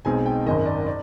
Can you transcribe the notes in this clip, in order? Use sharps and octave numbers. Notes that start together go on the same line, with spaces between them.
B1 B2 G#3 C4 D#4 G#5
G5
G#1 F#2 D#3 D#5
D5
D5